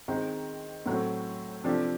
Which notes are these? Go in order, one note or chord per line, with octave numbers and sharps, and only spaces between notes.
D#3 G#3 C4 D#4
A2 F#3 A3 C4
C3 F3 A3 D4 G4